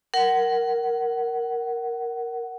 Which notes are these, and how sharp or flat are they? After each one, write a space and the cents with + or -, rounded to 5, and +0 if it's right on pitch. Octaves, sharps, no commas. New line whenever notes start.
A#4 +0 F#5 +20